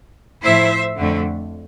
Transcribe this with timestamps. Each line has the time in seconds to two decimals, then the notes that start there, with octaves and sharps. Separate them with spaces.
0.43 A2 F3 A3 E4 C5 E5
0.98 F2 D3 A3